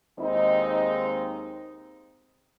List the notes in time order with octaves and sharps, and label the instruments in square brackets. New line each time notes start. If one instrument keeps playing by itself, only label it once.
[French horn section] D#2 G#3 C4 D#4